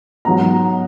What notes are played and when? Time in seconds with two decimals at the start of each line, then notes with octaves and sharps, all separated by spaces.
0.25 G#2 F#3 B3 A#5